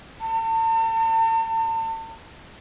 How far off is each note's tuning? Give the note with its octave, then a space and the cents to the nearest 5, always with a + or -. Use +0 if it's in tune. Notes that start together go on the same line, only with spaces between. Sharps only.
A5 +40